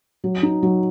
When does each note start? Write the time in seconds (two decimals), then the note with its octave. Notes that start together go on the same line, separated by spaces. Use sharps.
0.24 F#3
0.43 D#4
0.63 F#3